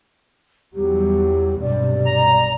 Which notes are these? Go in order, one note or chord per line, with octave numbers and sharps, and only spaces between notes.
E2 F#3 G3 G4
B1 G2 C3 D5
A#5